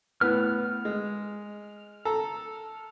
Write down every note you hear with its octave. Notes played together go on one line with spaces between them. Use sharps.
A2 B3 B4 F6
G#3
A4 A#5